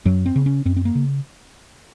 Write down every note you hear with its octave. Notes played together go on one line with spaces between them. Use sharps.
F#2 F#3
C4
C#3
C#4
F#2 C4
C4
A#3
C#3